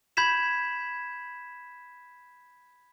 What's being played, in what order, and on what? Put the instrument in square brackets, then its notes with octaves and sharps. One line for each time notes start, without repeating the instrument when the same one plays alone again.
[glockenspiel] B5 G6 G#6 B6 E7